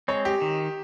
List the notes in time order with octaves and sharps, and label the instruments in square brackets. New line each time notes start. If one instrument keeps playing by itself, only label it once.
[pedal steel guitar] G#3 C4 [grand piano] C#5
[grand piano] G4
[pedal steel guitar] D#3